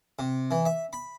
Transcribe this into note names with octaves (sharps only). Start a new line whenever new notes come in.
C3
E3
E5
B5